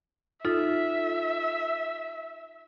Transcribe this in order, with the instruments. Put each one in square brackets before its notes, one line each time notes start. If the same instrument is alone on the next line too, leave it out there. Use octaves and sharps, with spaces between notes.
[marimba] D#4 F4 A4 [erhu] E5